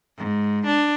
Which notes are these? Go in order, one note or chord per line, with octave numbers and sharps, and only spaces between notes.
G#2
D4